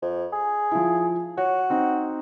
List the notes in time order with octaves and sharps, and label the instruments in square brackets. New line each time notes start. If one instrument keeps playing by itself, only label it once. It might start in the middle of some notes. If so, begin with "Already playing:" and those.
[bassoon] F2
G#4
[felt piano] F3 E4
[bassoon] F#4 [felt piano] C#5
[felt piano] C4 D#4